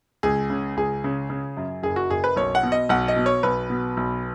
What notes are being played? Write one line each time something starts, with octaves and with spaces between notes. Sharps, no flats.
C#2 G#4
C#3
C#2 G#4
C#3
C#3
F#2
F#1 G#4
F#4
F#1 G#4
B4
B1 C#5
F#5
B2
D#5
B1 F#5
D#5
B2
C#5
B1 B4
B2
B1